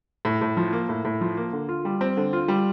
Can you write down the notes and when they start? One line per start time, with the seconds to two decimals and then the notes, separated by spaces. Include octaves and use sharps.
0.25 A2
0.42 A2
0.57 F3
0.73 A#3
0.89 A2
1.05 A2
1.21 F3
1.37 A#3
1.53 D3
1.69 F4
1.85 G3
2.01 C4
2.17 D3
2.33 F4
2.48 G3